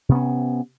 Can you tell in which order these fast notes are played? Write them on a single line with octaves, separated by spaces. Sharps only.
C3 B3 C#4